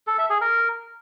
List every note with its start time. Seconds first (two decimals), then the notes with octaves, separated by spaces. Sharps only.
0.07 A4
0.19 E5
0.30 G#4
0.41 A#4